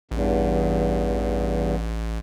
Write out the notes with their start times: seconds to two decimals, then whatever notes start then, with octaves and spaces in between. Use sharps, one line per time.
0.11 A1 E2 G2